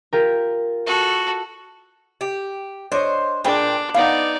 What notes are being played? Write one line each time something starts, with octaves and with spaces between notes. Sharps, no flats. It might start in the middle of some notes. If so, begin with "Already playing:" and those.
F4 G4 A#4
F#4 A4
G4
D4 C5 C#5 D#5
A#2 D4 G#4 B4 G5
B3 D#4 D5 F5 F#5